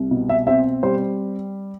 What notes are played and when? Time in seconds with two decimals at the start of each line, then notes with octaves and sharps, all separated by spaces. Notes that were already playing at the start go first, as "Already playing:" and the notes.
Already playing: C2
0.11 B2
0.29 E5
0.47 C4 E5
0.83 G3 C5